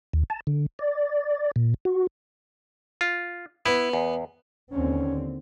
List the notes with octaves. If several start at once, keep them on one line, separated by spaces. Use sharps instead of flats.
D#2
A5
D3
D5
A#2
F#4
F4
B3 E4
E2
D#2 D3 C4 C#4